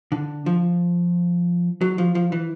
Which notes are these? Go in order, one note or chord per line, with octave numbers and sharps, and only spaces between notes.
D3
F3
F#3
F3
F3
E3